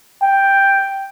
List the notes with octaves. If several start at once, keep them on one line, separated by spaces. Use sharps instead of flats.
G5